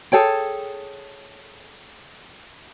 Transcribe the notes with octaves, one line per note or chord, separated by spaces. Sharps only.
G#4 A4 C#5 G5